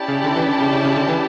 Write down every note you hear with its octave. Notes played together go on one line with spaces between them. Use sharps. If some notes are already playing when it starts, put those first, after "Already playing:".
Already playing: C#4 E4 G4 D5 A5
C#3
D3
E3
D3
C#3
C#3
C#3
D3
E3